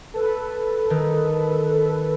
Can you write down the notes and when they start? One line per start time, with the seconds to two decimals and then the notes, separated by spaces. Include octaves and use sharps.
0.14 A4 B4
0.90 D#3